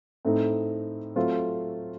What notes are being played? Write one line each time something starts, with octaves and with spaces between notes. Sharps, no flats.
A2 A3 C4 D#4 A4
F#3 A3 C4 F4 C5